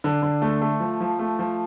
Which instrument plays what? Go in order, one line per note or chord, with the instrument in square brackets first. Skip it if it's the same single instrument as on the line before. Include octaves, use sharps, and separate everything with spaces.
[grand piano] D3
D3
A3
A3
F3
F3
A3
F3